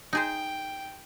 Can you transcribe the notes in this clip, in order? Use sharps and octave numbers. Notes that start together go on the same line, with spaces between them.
D#4 G#4 C5 G5